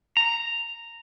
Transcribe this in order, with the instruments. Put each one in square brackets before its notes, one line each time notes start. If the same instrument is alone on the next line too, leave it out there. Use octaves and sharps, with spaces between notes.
[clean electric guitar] A#5